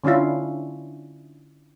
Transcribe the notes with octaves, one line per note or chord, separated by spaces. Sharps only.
D3 C#4 D4 E4 F4